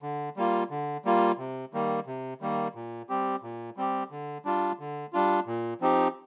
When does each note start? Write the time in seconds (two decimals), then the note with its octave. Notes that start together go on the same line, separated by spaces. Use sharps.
0.02 D3
0.37 G3 A#3 F4
0.70 D3
1.05 G3 A#3 F4
1.38 C3
1.73 D#3 G3 A#3
2.07 C3
2.41 D#3 G3 A#3
2.75 A#2
3.09 G3 C4 G4
3.43 A#2
3.77 G3 C4 G4
4.11 D3
4.45 G3 D4 F4
4.79 D3
5.13 G3 D4 F4
5.47 A#2
5.81 F3 C4 D#4 G4